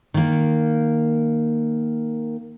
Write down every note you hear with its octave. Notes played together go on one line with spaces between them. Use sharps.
D#3 A#3